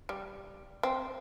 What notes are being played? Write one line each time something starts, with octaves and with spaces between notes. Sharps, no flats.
G3
C4